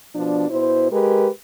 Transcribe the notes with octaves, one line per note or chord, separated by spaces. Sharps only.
B2 F3 D4
B2 E4 C5
G#3 G4 A#4 B4